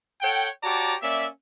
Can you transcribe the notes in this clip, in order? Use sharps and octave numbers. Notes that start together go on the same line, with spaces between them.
A4 C#5 F#5 G5
F#4 G4 C#5 D5 A5 A#5
A#3 C#4 D5 E5